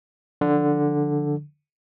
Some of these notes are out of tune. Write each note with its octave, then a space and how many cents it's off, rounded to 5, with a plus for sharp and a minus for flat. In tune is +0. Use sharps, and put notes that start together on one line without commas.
D3 +0 F3 +0